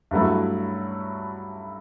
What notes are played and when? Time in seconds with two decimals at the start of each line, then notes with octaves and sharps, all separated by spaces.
0.11 G2 F#3 A3 E4